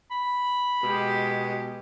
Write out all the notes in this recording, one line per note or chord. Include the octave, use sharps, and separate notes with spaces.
B5
B2 G#3 G4